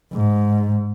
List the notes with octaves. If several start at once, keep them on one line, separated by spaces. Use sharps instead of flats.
G#2